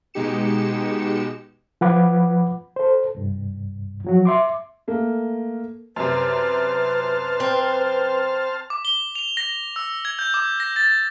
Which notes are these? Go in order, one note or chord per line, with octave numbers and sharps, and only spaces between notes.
B2 G#3 D#4 G4 C#7 E7
F3 B4 F#5 B5 D6
A4 C5
C2 G2
F3 F#3 F#4
E5 C6 D6
A3 A#3
F#2 C3 B4 C5 A5 F6
C4
D6
G7
F7
A#6
E6
G#6
G6
D6
A#6
A6